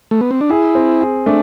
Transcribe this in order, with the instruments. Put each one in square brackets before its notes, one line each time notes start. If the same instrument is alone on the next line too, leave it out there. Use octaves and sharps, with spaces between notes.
[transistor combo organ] A3
B3
C4
D4
[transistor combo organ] E4 [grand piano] G#4
[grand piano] C4
G#4
[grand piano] A3 [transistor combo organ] D4